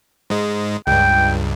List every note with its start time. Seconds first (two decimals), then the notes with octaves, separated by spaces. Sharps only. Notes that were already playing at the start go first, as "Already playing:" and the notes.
0.30 G#2 G#3
0.87 C#2 G2 G5